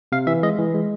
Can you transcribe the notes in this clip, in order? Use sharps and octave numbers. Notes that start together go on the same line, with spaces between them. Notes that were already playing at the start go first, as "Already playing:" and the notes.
C3 F5
E3 E5
G#3 D#5
E3
G#3